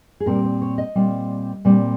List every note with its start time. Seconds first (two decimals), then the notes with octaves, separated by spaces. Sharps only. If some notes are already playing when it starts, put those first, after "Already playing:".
0.20 G#4
0.26 A#2 G3 C4 A#4
0.44 C5
0.62 C#5
0.78 D#5
0.95 A#2 G3 C4
1.65 A#2 G3 C4